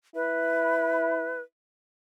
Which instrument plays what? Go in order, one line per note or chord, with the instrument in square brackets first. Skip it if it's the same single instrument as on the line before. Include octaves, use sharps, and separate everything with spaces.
[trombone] E4 [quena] B4